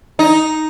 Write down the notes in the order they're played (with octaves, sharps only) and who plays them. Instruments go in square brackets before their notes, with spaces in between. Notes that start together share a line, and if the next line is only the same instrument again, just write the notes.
[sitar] D#4